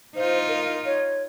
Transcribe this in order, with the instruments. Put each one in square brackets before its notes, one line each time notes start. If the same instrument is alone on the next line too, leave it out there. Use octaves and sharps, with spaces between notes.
[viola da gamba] D#4 F4 [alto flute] C5
[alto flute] A#4
C#5